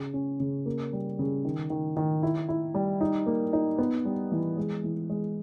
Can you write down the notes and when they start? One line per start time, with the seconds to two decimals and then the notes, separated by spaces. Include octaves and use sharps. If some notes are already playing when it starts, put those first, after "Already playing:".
Already playing: C#3
0.14 C#4
0.40 C#3
0.66 A#3
0.93 G3
1.19 C#3
1.45 D#3
1.70 D#3
1.97 D#3
2.23 E4
2.49 E4
2.75 G3
3.01 D#4
3.26 A#3
3.53 D#4
3.79 B3
4.05 G3
4.32 E3
4.57 G#3
4.84 E3
5.10 G#3